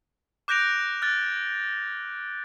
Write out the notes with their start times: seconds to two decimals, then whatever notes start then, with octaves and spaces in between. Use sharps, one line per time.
0.48 D6 F#6 G6 A#6 D7 F7
1.02 F6 F#6 A6